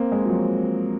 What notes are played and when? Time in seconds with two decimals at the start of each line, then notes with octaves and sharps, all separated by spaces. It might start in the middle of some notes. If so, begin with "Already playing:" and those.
Already playing: A#3 C4
0.12 G#3
0.25 F3
0.29 F#3